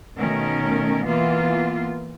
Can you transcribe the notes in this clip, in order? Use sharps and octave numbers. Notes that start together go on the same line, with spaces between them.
B2 D#3 A3 C#4 A#4
E3 A#3 B3 F4